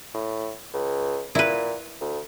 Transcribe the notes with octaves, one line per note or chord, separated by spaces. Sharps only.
A2
C#2
A#2 E4 B4
D2